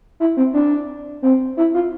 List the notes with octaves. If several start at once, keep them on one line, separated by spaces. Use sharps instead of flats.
E4
C4
D4
C4
E4
F4